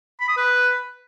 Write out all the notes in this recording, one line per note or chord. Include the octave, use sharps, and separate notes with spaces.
B5
D#6
B4